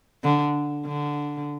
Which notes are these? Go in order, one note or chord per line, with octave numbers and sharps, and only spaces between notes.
D3
D3